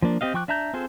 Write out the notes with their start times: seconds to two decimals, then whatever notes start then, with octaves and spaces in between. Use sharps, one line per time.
0.02 F3 A#3 D4
0.21 C4 G4 D#5 F5
0.34 F3 G5 C#6 D6 F#6
0.48 D4 E5 A5 A#5 G6
0.74 C4 F4 G#4 A4 C5